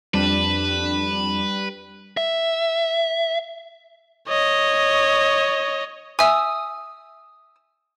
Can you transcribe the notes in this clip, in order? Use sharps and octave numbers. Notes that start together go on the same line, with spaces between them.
F2 G3 D4 B4 E7
E5
C#5 D#5
E5 G#5 D#6 E6